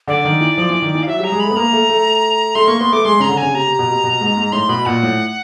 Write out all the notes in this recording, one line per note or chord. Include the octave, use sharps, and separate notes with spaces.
D3 D5
D#3
E3
F3
E3
D#3
E3
F5
F#3 E5
G3 A#5
G#3
A3 B5
B3
A#3 A#5
A3
A3
A3 C6
A#3 C#6
B3 C6
A3 D6
G#3 C6
C#3 A#5
D3
C#3 G#5
C3 A#5
C3
B2
C3
B2
G#2
G#2
A2 C6
B2 B5
A#2 F#5
A2